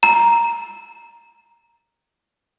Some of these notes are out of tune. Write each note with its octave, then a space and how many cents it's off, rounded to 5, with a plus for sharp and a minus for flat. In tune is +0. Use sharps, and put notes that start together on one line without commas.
A#5 +0